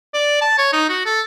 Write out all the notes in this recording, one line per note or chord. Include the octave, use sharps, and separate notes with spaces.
D5
A5
C#5
D#4
F#4
A4